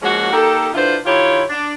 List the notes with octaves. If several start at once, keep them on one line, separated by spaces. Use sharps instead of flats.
F3 G#3 A#3 C#4 F#4
A#3 D#4 G4 A4
D3 D4 E4 F4 B4 C5
D#3 E4 F4 G4 C#5
D4